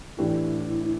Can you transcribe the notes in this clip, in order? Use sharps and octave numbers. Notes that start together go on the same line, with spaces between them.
A2 E3 A3 D4 E4 G4